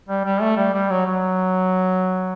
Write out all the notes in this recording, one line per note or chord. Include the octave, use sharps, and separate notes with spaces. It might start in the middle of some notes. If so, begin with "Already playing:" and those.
G3
G3
A3
G3
G3
F#3
F#3